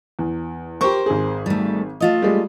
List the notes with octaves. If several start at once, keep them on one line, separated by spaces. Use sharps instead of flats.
E2
G4 A#4 C5 C#6
G#1 G#4
G3 A3
A3 F4 D#5
G3 G#3